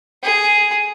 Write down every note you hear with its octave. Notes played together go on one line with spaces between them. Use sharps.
G#4